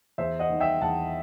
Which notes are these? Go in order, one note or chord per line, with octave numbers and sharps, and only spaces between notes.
E2 C5 E5
D#5 F#5
D#3 G3
E5 G5
E2 F#5 A5